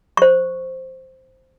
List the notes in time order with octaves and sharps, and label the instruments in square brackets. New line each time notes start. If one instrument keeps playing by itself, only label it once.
[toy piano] C5 C#6